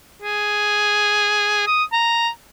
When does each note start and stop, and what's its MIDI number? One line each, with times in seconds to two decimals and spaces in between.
0.22 1.62 68
1.67 1.84 87
1.92 2.29 82